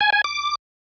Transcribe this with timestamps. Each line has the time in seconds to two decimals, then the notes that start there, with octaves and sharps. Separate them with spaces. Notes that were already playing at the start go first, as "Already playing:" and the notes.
0.01 G#5
0.13 G#5
0.24 D6